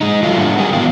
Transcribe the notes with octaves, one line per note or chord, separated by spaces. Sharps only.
G#3 D#4
F#3 A3 F4
G#2 G3 A3 D4 F#5
G4 G#4 A#4 G5 G#5
A2 E3 F#3 B3 E4 F5